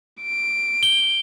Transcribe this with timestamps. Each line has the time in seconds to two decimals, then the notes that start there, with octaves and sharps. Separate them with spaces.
0.23 D7
0.83 G7